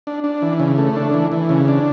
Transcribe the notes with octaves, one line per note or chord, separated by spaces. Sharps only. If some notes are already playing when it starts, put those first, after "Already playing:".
D4
D4
E3
C#3
A3
D4
E3
E3
C#3
D4